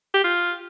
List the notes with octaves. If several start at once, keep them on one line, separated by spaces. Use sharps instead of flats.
G4
F4